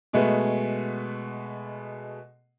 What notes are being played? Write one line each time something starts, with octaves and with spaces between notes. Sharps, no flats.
B2 G#3 A3 B3